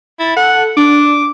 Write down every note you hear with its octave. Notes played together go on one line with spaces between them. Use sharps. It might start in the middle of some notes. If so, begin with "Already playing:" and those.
E4 A6
A4 F#5
D4 D6